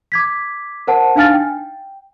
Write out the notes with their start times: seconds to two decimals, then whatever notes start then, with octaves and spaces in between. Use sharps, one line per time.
0.12 D6 G#6 B6
0.87 A#4 C5 F#5 A5
1.15 D4 D#4 F5 G#5 F6 A6
1.34 G5